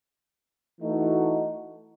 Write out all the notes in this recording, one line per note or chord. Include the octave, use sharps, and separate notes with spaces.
E3 A3 D#4 F#4